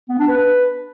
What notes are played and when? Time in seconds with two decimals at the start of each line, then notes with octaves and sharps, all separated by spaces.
0.09 B3
0.19 D4
0.29 B4